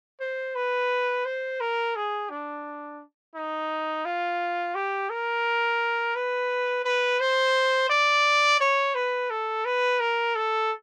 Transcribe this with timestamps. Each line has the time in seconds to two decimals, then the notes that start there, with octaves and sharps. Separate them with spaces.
0.20 C5
0.55 B4
1.25 C5
1.61 A#4
1.96 G#4
2.30 D4
3.35 D#4
4.05 F4
4.75 G4
5.10 A#4
6.15 B4
6.85 B4
7.20 C5
7.90 D5
8.60 C#5
8.95 B4
9.30 A4
9.65 B4
10.00 A#4
10.35 A4